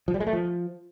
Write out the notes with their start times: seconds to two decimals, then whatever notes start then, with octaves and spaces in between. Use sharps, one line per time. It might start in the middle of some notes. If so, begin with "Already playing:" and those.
0.08 F3
0.14 G3
0.20 G#3
0.27 A3
0.33 F3